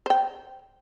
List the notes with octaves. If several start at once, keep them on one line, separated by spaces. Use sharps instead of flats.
C5 G5